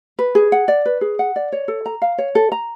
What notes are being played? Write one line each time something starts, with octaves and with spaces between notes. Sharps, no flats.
B4
G#4
F#5
D5
B4
G#4
F#5
D5
C#5
A4
A#5
F5
C#5
A4
A#5